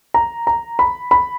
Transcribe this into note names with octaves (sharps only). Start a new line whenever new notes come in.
A#5
A#5
B5
B5